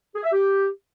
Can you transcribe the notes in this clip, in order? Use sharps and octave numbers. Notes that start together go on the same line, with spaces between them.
G#4
E5
G4